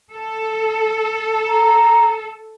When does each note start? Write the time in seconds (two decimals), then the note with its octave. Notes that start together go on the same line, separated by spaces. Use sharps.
0.11 A4
1.47 A#5